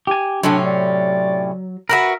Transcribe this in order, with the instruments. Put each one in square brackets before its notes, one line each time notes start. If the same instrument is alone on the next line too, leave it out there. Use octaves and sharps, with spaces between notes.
[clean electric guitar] G4 G#5
[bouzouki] A2 C3 C#4 [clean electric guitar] F#3 [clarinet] D4
[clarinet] D5
[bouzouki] F#4 G4 B4 [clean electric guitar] A#4 E5